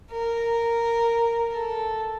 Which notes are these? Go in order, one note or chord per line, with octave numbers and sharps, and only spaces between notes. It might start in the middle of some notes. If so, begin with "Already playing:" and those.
A#4
A4